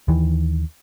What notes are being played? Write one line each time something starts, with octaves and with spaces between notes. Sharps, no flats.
D#2 D#3 E3